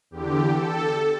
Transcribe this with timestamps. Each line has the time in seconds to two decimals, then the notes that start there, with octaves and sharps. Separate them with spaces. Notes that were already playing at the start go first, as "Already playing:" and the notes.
0.11 E2 D3 G4
0.51 A4